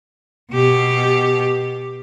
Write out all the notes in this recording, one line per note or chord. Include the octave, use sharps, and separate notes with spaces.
B2 G4